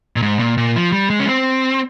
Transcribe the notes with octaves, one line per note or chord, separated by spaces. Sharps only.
A#2
G#2
A#2
A#2
F3
G3
G#3
C#4
C4